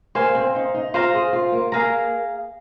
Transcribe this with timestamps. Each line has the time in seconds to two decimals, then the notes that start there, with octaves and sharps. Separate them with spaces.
0.15 A#3 C5 F5 G#5
0.35 C4
0.55 D#4
0.74 D#4
0.94 F4 C5 F5 A#5
1.14 G#4
1.33 F4
1.52 A#3
1.72 A#3 G#4 F5 A#5